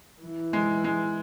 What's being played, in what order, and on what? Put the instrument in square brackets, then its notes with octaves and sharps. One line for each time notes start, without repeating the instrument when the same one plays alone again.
[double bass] E3
[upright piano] G#3
G#3